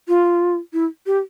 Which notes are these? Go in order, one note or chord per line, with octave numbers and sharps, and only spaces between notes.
F4
E4
G4